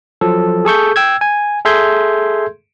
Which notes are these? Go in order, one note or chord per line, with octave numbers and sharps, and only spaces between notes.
F3 F#3 A4
G#4 A4 C#6 G6
G5 E6 G#6
G#5
G#4 A4 E5 C6 G6 G#6